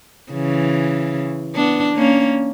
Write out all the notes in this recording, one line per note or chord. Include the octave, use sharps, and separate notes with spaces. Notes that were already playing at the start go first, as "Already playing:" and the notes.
C#3 E3
B3 D4
A#3 C#4